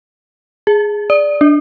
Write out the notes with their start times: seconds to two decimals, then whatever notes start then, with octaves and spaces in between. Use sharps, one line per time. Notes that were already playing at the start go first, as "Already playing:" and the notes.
0.67 G#4
1.10 D5
1.41 D4